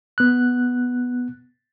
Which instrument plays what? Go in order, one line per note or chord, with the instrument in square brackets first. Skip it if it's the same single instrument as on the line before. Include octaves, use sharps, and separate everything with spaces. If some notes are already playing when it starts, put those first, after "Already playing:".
[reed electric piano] B3 F#6